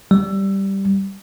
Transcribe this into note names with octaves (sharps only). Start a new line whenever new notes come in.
G3